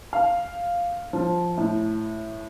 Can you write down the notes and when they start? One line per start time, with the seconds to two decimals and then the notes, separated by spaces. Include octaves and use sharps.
0.13 F5
1.13 F3
1.58 A2